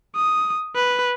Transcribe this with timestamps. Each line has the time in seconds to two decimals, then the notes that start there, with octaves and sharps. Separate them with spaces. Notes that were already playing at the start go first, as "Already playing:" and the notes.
0.16 D#6
0.76 B4